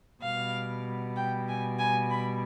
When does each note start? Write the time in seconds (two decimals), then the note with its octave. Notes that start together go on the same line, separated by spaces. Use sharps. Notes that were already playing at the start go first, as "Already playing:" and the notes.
0.22 B2 G3 F5
1.16 G5
1.48 G#5
1.79 G#5
2.10 B5